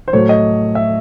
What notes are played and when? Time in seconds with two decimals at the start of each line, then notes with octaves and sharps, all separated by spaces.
0.08 C5
0.13 A2 F#3 A3 C#5
0.29 D#5
0.75 E5